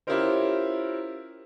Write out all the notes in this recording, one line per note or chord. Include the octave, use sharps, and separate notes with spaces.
C#4 E4 F4 G4 A#4 C5